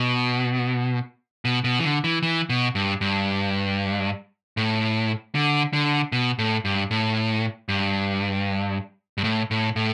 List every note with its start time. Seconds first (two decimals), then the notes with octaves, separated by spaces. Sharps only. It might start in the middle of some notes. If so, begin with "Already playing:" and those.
Already playing: B2
1.45 B2
1.64 B2
1.79 E3
1.84 D3
2.04 E3
2.23 E3
2.50 B2
2.75 G2
3.01 G2
4.57 A2
5.35 D3
5.73 D3
6.12 B2
6.39 A2
6.65 G2
6.91 A2
7.69 G2
9.18 G2
9.24 A2
9.51 A2
9.76 A2